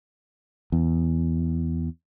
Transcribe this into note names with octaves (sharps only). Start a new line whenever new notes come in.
E2